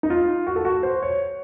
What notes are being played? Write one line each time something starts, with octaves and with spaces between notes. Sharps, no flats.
D#4
F4
F#4
A4
F#4
C5
C#5